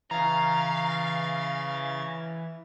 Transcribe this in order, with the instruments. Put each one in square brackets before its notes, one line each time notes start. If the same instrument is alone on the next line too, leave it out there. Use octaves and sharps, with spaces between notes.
[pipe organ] C#3 G#6 A6 [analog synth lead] E3 [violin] F5 [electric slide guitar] A#5